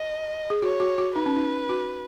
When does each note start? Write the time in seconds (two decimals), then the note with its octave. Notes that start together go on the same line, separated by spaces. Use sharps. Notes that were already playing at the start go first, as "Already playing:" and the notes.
Already playing: D#5
0.50 G#4
0.62 F#4 C#5
0.80 F#4
0.98 F#4
1.16 D#4 B4
1.26 C#4
1.36 D#4
1.69 F#4